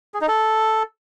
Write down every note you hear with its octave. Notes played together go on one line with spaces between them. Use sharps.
G#4
D#4
A4